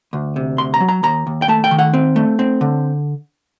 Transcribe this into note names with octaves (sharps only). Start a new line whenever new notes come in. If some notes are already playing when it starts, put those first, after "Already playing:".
D2
C3
D2 C6
A#5
F#3
A#5
D#2 A#5
D#2
G5
A3 A5
G5
D#3
F#5
C4
A3
C4
D3